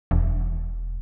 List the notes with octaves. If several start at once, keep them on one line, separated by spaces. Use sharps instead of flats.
E1